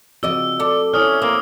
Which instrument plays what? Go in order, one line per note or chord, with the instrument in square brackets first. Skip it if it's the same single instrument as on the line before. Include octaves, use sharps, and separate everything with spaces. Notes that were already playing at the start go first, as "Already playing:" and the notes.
[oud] C#3 D5 D#5 [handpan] F3 C4 F#4 [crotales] E6
[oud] A4 [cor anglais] D5
[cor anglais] C#4 [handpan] E4 C#5 D5 [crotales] D#6 F6
[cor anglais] A#3 [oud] C4